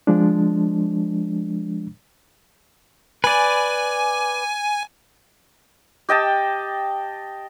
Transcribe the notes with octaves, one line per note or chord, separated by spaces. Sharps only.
F3 G#3 D4
B4 D5 G#5
G4 D#5 G5 A5